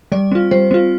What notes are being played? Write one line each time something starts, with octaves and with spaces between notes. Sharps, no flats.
G3 D5
C4 F4
G3 C5
C4 F4